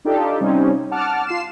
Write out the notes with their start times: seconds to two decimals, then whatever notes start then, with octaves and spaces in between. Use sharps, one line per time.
0.05 D4 D#4 F4 G4 A4
0.40 C3 G3 C4 C#4 D#4
0.91 F#5 A5 D6 F6
1.27 F4 C7 E7